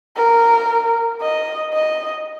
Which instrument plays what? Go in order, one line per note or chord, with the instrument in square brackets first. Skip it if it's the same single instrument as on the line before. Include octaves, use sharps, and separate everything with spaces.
[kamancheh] A#4
D#5
D#5